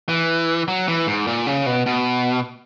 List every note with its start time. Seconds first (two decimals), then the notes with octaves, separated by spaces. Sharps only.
0.09 E3
0.68 F#3
0.88 E3
1.07 G#2
1.27 A#2
1.47 C#3
1.66 B2
1.86 B2